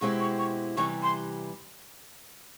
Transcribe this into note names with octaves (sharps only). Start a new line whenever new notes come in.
B2 G#3 C4 E4 G4 C#6
C#6
C#6
C3 E3 G3 C#6
C6